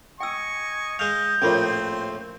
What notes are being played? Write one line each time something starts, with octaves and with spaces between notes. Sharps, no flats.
D#5 G5 G#5 C#6 E6
G#3 D#5 F5 G6
A#1 A2 A#3 C4 C#4 F4 C#5 C6